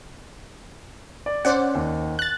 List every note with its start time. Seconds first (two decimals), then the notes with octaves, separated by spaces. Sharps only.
1.26 D5
1.45 C#4 C5 D5 F#5
1.75 D#2
2.19 F#6 A6